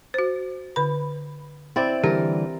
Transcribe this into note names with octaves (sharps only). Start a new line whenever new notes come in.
F#4 C5
D3 B5
C4 E4 D5
D3 E3 G3 G4 A#4